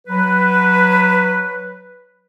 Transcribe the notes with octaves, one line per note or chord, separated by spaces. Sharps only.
F#3 B4